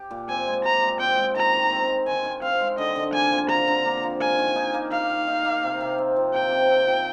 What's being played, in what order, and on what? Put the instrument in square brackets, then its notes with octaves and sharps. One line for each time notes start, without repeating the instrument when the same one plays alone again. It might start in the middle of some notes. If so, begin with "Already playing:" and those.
Already playing: [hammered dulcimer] G4
A#2
[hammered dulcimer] C4 [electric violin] G#5
[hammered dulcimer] G#3
[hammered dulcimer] G4 [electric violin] A#5
[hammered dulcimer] A#2
[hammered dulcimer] C4 [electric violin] G5
[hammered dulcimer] G#3
[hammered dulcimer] D#3 [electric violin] A#5
[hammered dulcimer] D#3
C4
G#3
[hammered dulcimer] D#3 [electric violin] G#5
[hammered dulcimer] D#3
[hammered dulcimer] C4 [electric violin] F5
[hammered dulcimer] G#3
[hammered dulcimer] D3 [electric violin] D#5
[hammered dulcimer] D3
[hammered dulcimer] A#3 [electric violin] G#5
[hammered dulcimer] F3
[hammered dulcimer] D3 [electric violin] A#5
[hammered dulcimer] D3
A#3
F3
[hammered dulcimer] A#4 [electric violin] G#5
[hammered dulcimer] D#3
D#4
A#3
[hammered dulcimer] A#4 [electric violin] F5
[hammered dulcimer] D#3
D#4
A#3
C3
C3
C4
F3
[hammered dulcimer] C3 [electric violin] G5
[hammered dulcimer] C3
C4
F3